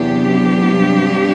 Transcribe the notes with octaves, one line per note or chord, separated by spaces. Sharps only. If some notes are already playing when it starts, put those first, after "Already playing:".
Already playing: E2 C3 F#3 B3 D4 G4
F#2
E2
A2
G2